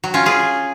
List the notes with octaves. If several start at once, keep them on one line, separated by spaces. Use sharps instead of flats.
F#3
C#4 F4
F4 G#4